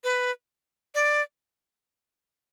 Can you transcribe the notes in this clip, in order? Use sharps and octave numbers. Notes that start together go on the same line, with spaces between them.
B4
D5